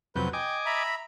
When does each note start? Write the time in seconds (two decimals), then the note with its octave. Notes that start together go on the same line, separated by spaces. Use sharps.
0.16 F2 C3 F#3 B4 G6
0.33 D#5 G5 G#5 D6
0.66 E5 A#5 B5